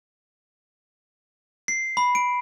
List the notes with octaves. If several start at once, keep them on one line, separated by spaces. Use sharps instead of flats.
C7
B5
D7